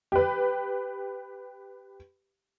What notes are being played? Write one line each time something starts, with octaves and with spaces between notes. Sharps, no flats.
G4 B4